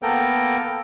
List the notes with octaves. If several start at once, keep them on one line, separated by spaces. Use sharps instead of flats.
A#3 B3 A4 A#4 G5